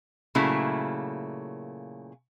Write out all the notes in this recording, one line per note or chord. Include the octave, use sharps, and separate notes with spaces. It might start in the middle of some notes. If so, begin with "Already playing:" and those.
A#2 C#3 F#3 A3 A#3 E4